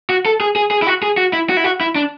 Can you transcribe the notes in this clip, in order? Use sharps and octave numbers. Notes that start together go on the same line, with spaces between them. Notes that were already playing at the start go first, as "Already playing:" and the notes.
F#4
A4
G#4
G#4
G#4
E4
F#4
G#4
F#4
E4
F#4
E4
F#4
E4
D4